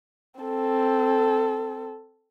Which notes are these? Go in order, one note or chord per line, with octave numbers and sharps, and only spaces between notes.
C4 A4